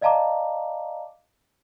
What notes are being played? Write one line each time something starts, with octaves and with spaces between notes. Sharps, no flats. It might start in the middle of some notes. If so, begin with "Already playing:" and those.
D5 D#5 F5 A5 A#5 D6